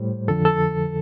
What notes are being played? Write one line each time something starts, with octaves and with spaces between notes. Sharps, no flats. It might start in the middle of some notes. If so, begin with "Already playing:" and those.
Already playing: A2 G3 C5
F2 D3 F3 A4
A4